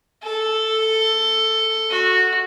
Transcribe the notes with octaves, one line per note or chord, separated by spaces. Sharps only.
A4
F#4